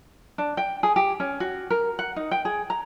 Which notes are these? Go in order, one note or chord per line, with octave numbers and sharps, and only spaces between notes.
D4
G5
G#4
G4
C#4
F#4
A#4
F#5
D#4
G5
G#4
A#5